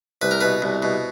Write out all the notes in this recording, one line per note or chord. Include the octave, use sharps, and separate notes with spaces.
C2 B4
A#4
B2 B4
C2
B2